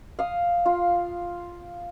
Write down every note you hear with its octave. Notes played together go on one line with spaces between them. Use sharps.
F5 D#6
F4